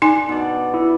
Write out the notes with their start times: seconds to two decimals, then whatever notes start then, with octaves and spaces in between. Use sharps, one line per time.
0.02 D4 D#4 G#5
0.29 B2 D5
0.74 E4